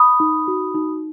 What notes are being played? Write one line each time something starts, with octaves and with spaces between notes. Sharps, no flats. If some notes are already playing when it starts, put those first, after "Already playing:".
Already playing: B5 D#6
D#4
F#4
D#4